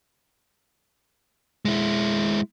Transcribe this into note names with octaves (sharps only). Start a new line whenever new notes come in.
G#3 E4